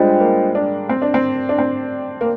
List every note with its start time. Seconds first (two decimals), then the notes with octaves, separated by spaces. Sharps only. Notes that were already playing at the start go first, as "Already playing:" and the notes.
Already playing: G3 G#3 D4 F4 C5 D#5 G5
0.20 A#3
0.55 D4
0.89 C4
1.02 D4
1.14 C4
1.49 D4
1.59 C4
2.21 A#3